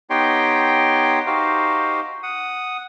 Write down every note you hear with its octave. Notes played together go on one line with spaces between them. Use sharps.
B3 D#4 G4 C#5 G5 C6
D#4 F#4 G4 C5 F5
F#5 D#6